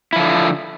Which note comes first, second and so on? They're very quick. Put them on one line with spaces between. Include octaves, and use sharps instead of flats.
E4 F3 D3